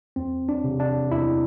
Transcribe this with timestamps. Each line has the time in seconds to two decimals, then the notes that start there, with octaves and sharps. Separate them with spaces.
0.16 E2 C4
0.49 D4
0.64 C3
0.80 D4
1.11 E2 E4